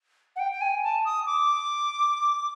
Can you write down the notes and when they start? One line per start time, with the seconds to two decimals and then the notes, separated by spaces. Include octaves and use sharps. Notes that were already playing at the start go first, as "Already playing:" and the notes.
0.36 F#5
0.39 G5
0.52 G5
0.61 G#5
0.83 A5
1.05 D#6
1.26 D6